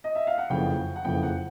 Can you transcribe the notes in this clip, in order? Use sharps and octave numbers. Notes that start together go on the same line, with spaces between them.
D#5
E5
F5
F#5
F#1 F2 C#3 E3 G5
F#5
F#1 F2 C#3 E3 G5
F#5